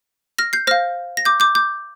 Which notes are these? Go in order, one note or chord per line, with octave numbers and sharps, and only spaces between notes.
F6 A#6
G6 C7
C5 F5 F6 A#6
A#6
D6 G6
D6 G6
D6 G6